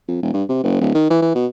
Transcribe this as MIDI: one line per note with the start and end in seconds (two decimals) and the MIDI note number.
0.08 0.18 41
0.22 0.29 28
0.34 0.43 43
0.49 0.61 48
0.63 0.79 30
0.80 0.91 26
0.94 1.08 51
1.10 1.18 52
1.22 1.31 52
1.35 1.46 47